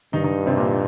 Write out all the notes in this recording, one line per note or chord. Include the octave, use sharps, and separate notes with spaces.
G2 D#3 D#4
D#3 D#4
C3 C4
A#2 A#3